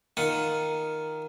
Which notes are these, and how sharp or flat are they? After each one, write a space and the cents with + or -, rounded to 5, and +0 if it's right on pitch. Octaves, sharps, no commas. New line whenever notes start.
D#3 +0 F4 +0 F#5 +0